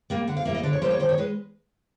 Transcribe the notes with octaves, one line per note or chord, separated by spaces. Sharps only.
G3 A#3
D3 F#5
F5
G3 A#3 E5
D#5
D3 D5
C#5
G3 A#3 C5
C#5
D#3 C5
C#5
G#3 B4